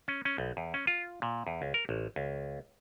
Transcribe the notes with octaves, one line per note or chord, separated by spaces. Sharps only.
C#4
C#4
B1
E2
C#4
F4
A#2
E2
C#2
A#4
A1
C#2